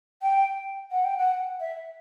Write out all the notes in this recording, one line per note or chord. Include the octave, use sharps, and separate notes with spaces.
G5
F#5
G5
F#5
E5